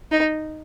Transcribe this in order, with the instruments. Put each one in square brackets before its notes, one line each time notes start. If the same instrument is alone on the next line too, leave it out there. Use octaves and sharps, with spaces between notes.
[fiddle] D#4